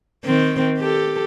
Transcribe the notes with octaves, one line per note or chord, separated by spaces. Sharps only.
D#3 C4
G4 A4